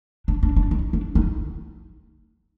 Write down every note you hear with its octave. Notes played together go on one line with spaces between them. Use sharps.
D4
D4
D4
D#4
D4
D#4